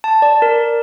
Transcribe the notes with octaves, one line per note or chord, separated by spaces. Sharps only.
A5
D5
A#4